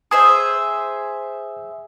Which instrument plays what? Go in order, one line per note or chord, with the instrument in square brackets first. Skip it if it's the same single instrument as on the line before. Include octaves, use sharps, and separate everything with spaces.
[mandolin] G#4 C5 E5 [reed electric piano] D#6